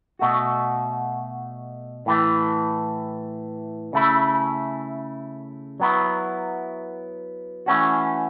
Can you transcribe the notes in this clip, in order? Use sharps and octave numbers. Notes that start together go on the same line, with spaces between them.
B2 A3 F#4
A2 E3 A3
C#3 A3 E4
F#3 B3 E4
E3 A3 C#4 F#4